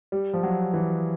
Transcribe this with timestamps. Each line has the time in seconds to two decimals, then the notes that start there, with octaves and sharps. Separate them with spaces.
0.12 G3
0.33 F3
0.43 F#3
0.74 E3